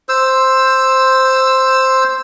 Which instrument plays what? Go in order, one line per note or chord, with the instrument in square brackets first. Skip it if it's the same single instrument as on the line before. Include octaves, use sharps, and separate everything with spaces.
[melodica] C5 E6